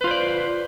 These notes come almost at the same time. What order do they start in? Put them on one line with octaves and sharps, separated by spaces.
B4 F4 C5 D5